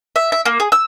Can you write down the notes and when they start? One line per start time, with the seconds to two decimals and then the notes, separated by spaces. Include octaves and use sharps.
0.16 E5
0.32 E5
0.45 A#3
0.60 G#4
0.72 E6